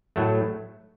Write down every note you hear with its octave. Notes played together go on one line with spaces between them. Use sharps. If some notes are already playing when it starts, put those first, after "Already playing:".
A2 F#3 A3